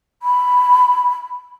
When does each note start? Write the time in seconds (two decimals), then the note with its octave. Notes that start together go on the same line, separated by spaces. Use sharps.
0.23 B5